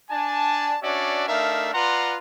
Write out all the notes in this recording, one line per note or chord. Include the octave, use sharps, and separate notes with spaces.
D4 G#5 A5
C#4 D4 F#4 C#5 D5 E5
A3 D4 D#4 A#4 E5 F5
F4 B4 D5 F#5 A#5 C6